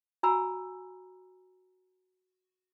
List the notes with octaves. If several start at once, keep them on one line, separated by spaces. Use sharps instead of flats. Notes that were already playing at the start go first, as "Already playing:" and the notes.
F#4 G#5 A#5 B5 E6